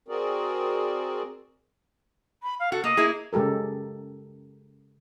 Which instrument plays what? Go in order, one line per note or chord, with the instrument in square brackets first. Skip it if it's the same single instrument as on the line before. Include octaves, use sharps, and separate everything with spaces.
[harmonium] C4 F#4 G#4 A#4 D5
[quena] B5
F5
[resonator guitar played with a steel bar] F#4 [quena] A4
[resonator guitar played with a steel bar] A#3 [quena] D#5
[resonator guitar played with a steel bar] A#3 E4 G#4
[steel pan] C#3 G#3 G4 A4 A#4